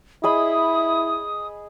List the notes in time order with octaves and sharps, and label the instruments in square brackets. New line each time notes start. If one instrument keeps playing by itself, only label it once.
[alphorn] E4 [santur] G#4 D#5 B5 [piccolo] D#6